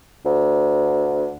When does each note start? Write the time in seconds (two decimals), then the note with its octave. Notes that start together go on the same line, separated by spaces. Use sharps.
0.25 D2